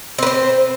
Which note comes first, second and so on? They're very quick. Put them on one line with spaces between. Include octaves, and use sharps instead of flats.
C4 B4 C5